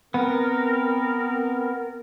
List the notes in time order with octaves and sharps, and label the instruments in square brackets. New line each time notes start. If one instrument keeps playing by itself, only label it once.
[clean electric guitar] B3 [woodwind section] C4 A#4